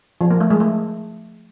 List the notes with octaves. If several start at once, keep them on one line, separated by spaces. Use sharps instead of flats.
F3
A#3
A3
G#3
A3